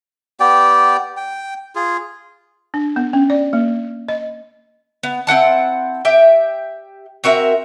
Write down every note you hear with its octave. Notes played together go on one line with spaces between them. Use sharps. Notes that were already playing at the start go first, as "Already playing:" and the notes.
B3 G4 D5 G5
G5
F4 G#4
D4
B3
C#4
D5
A#3
D#5
B3
C4 E4 F#5 A5
G4 E5 G5
C4 F#4 A#4 E5